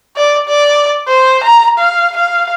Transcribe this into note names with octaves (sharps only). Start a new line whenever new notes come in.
D5
D5
C5
A#5
F5
F5